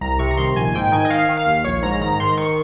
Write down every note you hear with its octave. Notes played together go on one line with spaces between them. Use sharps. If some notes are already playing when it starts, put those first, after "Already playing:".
C2 A#5
C3 C#6
A#5
D#3 C6
A#1 G#5
G#2 G5
D#3 G#5
D#5
D#3 F5
D#3
F5
D#2
A#1 C#5
G#2 A#5
D#3 A#5
D#3 C6
D#3 C#6